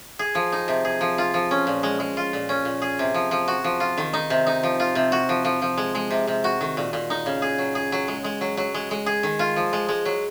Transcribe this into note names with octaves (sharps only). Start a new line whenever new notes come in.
G#4
F3
D#4
C3
G#4
F3
F4
F3
C#4
A#2
G#3
G#3
F4
A#2
C#4
A#2
G#4
C3
F3
F3
F#4
F3
F4
D#3
D#4
C3
D#4
F3
F4
C3
F#4
F3
F3
F3
G#3
G#3
C3
C3
F#4
D#3
A#2
A#2
D#4
C#3
G#4
F#3
G#4
F#3
G#3
G#3
F#3
F#3
G#3
G#3
G#4
D#3
F4
F3
G#3
G#3
F#3